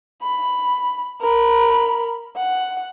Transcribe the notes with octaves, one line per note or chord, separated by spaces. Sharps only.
B5
A#4 B5
F#5